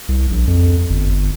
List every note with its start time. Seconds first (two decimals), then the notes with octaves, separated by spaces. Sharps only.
0.08 C2
0.31 A#1
0.48 F2
0.90 G1